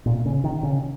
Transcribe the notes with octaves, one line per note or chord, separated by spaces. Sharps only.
A#2
C#3
D#3
C#3